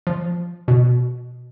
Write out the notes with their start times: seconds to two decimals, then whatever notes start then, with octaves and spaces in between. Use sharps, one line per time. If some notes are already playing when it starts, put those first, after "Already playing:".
0.07 F3
0.68 B2